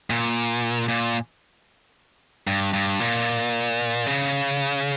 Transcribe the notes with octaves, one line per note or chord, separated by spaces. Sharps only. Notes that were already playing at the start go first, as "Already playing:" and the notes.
A#2
A#2
G2
G2
A#2
C#3